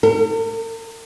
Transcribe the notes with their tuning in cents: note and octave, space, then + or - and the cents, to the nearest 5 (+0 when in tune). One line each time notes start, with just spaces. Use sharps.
A#4 -45